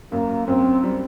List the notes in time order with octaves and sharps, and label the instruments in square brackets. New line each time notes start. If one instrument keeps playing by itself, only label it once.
[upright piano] F#2 [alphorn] A#3
[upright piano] F#2 [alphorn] C4
[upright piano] G3